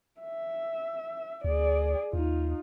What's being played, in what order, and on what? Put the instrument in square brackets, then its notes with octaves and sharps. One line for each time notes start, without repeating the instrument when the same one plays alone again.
[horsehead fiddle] E5
[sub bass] D2 [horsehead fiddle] G#4 D5
[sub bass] D#2 [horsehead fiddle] D#4 F4